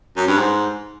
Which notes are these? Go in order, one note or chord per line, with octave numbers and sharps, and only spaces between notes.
F#2
G2
G#2